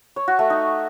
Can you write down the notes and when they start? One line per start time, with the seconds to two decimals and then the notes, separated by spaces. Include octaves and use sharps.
0.16 C#5
0.28 F#4
0.39 A3
0.50 D#4